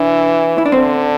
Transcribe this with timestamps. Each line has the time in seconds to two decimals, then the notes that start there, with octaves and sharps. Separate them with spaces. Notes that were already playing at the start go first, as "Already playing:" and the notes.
Already playing: E3 D4
0.58 E4
0.66 D4
0.72 D3 C4